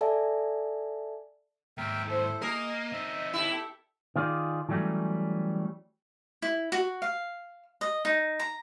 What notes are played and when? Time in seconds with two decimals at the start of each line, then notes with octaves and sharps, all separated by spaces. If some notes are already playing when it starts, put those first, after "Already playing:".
0.01 A4 D5 E5 G#5 A5
1.78 D#2 G#2 A#4 E5 G5
2.07 E4 A4 C5
2.42 A#3 G#4 A#4 D#5
2.92 C4 D#4 E5
3.33 E4 G4 A4
4.16 D#3 F4 G#4 D5
4.69 E3 F#3 G3 A3 C#4
6.42 E4
6.72 F#4
7.02 F5
7.81 D#5
8.05 D#4
8.39 A#5